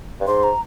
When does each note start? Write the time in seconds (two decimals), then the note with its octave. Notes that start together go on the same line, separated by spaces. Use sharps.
0.20 G2
0.27 G#2 C6
0.43 A#5